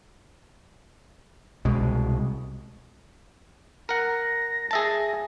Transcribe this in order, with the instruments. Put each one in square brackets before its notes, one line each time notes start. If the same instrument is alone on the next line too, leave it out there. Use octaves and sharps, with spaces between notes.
[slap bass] C2 B2 G#3
[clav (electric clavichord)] A#4 F#5 [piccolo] A#6
[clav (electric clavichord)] G#4 E5 A5